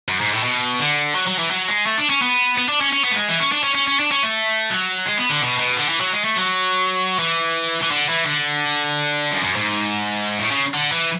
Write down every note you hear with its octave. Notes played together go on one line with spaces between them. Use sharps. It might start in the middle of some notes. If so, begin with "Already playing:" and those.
F#2
G#2
A2
B2
D3
F#3
F#3
E3
F#3
G#3
A3
D4
C#4
B3
B3
D4
C#4
C#4
B3
A3
G#3
E3
C#4
D4
C#4
C#4
C#4
D4
C#4
A3
F#3
G#3
B3
D3
B2
B2
D3
E3
F#3
G#3
A3
F#3
E3
E3
D3
E3
D3
F#2
F#2
G#2
A2
C#3
D3
E3